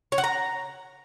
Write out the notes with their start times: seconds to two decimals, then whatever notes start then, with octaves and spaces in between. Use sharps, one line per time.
0.12 C#5
0.18 F#5
0.24 A#5